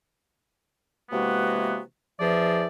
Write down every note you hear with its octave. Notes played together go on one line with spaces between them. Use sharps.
C3 E3 G#3 A#3 B3 F#4
E2 E3 F3 G#4 D5 E5